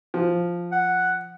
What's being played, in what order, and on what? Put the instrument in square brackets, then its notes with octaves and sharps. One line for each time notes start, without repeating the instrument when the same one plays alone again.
[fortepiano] F3
[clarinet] F#5